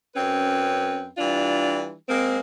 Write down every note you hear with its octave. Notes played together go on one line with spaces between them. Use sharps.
F#2 C4 C#4 B4
E3 G3 D4 F4
G#3 A#3 C4